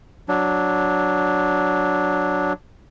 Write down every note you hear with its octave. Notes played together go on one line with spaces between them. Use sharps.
F#3 D4